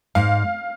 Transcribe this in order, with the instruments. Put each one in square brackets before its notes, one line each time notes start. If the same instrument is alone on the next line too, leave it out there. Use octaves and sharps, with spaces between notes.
[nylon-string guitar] G#2 [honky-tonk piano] F5